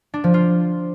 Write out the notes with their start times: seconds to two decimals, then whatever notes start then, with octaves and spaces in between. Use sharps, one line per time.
0.14 D4
0.24 F3
0.34 F4